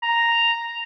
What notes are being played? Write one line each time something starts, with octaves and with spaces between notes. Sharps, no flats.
A#5